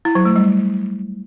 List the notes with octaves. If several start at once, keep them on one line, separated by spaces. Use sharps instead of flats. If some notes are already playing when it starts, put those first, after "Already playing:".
E4
F#3
A3
G3